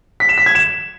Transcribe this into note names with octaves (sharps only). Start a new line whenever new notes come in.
B6
E7
B6
G#6
E7